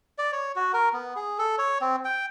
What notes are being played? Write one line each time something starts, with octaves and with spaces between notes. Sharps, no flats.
D5
C#5
F#4
A#4
B3
G#4
A4
C#5
C4
G5